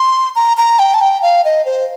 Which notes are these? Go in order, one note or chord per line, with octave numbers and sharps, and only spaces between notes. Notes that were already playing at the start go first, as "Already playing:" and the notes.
Already playing: C6
A#5
A#5
G5
A5
G5
F5
D#5
C5